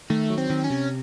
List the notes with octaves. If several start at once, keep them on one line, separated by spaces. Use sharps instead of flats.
D#3 A3
F#3
C4
D#3
C#4
C3